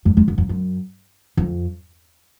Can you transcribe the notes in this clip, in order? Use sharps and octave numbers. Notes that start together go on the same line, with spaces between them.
F#2
F2
F#2
F2
F#2
F2